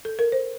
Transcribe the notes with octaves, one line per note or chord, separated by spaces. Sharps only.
A4
A#4
C5